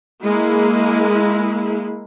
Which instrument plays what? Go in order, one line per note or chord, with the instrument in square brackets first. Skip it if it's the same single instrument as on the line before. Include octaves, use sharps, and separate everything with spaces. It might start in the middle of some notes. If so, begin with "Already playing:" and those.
[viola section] G#3 A#3 E4